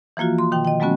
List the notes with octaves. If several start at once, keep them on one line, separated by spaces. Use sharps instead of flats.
E3 F3 A#3 F4 F#4
C6
B2 D#3 G5
D#5 G5
F#3 G#3 A3 B3 C#4 F#4